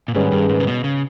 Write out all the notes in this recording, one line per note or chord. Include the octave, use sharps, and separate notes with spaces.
A#2
G#2 D#3 G3 C#4 G#4 B4
G2
G#2
C#3
B2
C#3